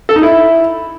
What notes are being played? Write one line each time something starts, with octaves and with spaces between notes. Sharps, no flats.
A4
D#4
E4